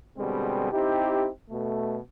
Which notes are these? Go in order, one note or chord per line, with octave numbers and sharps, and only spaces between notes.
B2 D3 G3 G#3 C4
C4 D#4 E4 G4
B2 A3